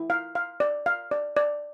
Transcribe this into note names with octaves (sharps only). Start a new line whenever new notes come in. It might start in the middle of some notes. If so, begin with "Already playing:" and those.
Already playing: E4
F5
F5
D5
F5
D5
D5